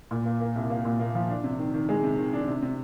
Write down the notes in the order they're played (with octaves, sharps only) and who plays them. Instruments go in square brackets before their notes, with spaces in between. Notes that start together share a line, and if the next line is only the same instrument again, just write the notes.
[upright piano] A#2
A#3
A#3
C2
A#3
A#2
A#3
F3
D4
C3
D#3
D#3
G#3
C3
D#3
D4
C3
C3